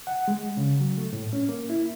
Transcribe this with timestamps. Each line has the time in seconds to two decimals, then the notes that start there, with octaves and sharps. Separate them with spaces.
0.07 F#5
0.28 G#3
0.57 C#3
0.80 F#3
0.98 A3
1.13 A2
1.33 C#4
1.49 A#3
1.70 E4